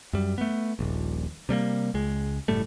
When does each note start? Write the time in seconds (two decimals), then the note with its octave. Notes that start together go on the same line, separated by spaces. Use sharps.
0.13 F#2 G3
0.38 A3 B3
0.79 D#1 A#1
1.49 C3 G3 A3 A#3
1.94 C#2 G#3
2.48 F#1 A2 G3 A3